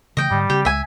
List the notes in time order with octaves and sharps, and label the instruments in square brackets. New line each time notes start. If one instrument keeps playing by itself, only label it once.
[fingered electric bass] C#3 E3 A3 [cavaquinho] D#5 G5
[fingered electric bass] G#2 D3 [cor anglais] G3
[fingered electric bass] C#3 C4 [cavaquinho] G4
[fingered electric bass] C#2 G#3 [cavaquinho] E5 G#5